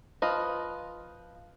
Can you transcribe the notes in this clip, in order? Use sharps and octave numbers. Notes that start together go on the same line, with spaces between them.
F3 F4 B4 D#5